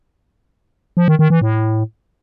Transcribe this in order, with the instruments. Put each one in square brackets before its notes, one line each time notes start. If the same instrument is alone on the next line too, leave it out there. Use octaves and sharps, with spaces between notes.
[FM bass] F3
D#3
D#3
E3
A2